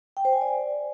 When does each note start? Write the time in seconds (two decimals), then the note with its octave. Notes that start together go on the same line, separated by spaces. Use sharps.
0.17 G5
0.25 C5
0.33 G#5
0.41 D5